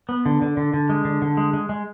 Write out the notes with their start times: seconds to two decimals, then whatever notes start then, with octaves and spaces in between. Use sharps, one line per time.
0.09 B3
0.26 D3
0.42 D3
0.57 D3
0.74 D3
0.90 G#3
1.05 D3
1.22 D3
1.37 G#3
1.53 G#3
1.69 G#3